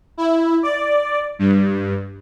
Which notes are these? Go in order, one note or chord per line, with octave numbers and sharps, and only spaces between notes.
E4
D5
G2